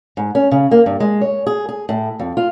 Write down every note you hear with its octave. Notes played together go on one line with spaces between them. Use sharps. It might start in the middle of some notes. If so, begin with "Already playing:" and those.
G#2
C#4
C#3
A#3
G2
G#3
C#5
G#4
G#4
A2
F2
F4